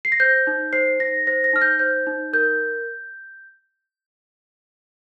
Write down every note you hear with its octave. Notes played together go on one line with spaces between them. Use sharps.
C7
A#6
C5 G6
D#4
C5 C7
D#4 A#6
C5 A#6
A#6
D#4 F6
G6
C5 G6
D#4
A#4 G6